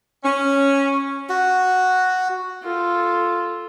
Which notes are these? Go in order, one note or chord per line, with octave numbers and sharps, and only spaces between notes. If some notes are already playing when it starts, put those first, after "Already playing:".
C#4
F#4
F4 A4